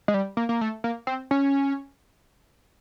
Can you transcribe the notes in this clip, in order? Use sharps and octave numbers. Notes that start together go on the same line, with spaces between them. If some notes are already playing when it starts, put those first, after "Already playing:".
G#3
G3
A#3
A#3
A3
A#3
C4
C#4